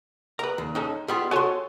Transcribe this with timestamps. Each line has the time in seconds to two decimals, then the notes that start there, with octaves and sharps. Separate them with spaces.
0.39 A#4 B4 A#5
0.58 D#2
0.75 G#3 C#4 D#4 A4
1.08 G3 B3 F4 G4 G#4
1.31 F#4 A4 C#5 G#5 C6